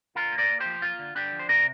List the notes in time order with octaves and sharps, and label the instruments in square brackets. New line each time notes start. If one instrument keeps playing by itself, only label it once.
[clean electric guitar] D3 F4 A#4
A#3
A#4 D5
A#3
G4 C5
F3
A#3 F4
D3
D3 D4 G4
F3
C5
C3 A#4 D5